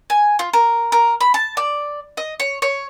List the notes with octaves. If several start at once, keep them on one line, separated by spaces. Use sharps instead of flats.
G#5
F4
A#4
A#4
B5
A5
D5
D#5
C#5
C#5